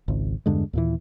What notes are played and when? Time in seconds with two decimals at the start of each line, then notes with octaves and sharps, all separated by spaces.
0.08 G#1 C#2
0.46 E2 G2 D3 G#3
0.73 D#2 A#2 E3